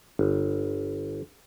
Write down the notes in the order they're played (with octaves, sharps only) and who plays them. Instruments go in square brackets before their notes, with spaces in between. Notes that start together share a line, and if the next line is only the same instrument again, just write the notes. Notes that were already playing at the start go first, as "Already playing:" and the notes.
[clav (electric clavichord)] G1